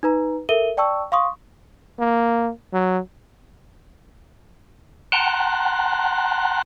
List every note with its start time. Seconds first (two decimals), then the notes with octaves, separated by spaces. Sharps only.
0.03 D#4 B4 A#5
0.49 A4 A#4 E5 D#7 G7
0.77 D5 G5 A5 C#6 E6
1.12 F5 C6 C#6 D#6
1.99 A#3
2.73 F#3
5.12 F#5 G5 A5 A#5 C6 F#6